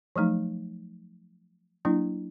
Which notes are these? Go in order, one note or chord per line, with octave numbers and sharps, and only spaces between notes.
F3 F#3 A3 D#4
F#3 A#3 D4 E4